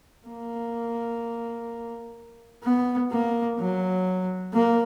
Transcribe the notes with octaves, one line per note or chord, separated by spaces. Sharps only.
A#3
B3
A#3
F#3
A#3